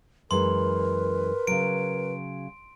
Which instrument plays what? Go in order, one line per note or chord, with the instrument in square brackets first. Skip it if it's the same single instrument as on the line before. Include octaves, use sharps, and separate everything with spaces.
[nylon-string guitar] F#2 E3 G#3 [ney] A#4 [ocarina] B4 [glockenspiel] C6
[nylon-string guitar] C#3 F#3 [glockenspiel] D7